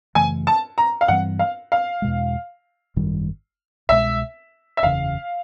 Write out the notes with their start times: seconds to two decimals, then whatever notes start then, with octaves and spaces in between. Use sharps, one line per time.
0.15 F#2 C#3 E3 A3 G#5
0.47 A5
0.78 A#5
1.01 F5
1.08 G2 E3 G3 C4 F#5
1.39 F5
1.72 F5
2.02 E2 B2 G#3
2.96 G#1 F#2 D#3 G3
3.89 C2 B2 G#3 E5
4.77 E5
4.82 F#1 E2 C#3 F5